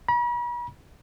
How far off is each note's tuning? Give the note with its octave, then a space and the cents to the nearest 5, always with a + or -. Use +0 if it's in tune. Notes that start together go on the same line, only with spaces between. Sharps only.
B5 -45